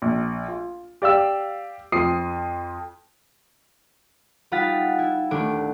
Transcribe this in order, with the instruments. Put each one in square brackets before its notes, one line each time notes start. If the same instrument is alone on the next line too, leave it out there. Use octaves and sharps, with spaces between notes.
[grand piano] A#1
F4
G4 D5 F5 E6
F2 F3 D#6 C7
[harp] G3 D#4 F4 F#5 A6 B6
E4
D#1 A3 D4 D6